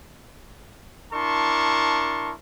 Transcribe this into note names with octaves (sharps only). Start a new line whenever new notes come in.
D4 E4 A#4 A5 C6 C#6